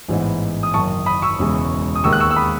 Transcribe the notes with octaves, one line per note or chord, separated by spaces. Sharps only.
A1 G#2 E3 B3 D#4
D#6
F#1 F#2 D#3 A5 C#6
B5 D#6
C#6 E6
E1 E2 C#3 E3 G#3
D#6
D#2 D#3 G#3 B3 C#6 E6
F#6
C#6 E6
E6
B5 D#6